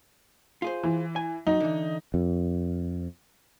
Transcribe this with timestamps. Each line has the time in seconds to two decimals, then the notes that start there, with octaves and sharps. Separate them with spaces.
0.62 F4 G#4 C5
0.83 E3
1.16 G#5
1.47 F#3 D#4
1.60 D3 E3
2.14 F2